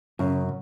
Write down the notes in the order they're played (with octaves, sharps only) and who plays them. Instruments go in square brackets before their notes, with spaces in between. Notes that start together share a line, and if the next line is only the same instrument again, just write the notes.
[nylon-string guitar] F#2 [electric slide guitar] C#3